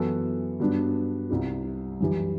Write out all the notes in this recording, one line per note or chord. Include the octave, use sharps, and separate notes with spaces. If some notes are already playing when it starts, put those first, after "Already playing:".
Already playing: F#2 E3 B3 F#4 A4
G2 F#3 B3 D4
C2 C3 G3
F#2 E3 G3